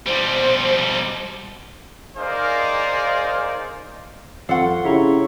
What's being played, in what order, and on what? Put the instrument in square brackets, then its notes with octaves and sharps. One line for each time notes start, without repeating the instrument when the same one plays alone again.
[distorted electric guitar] B2 G3 [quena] C5
[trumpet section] D#4 G#4 A#4 C5 D5 F5
[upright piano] F2 [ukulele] A4 F#5 [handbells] F5 C6 C#6
[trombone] C#3 [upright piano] E4 G4 [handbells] E5 A#5 C#6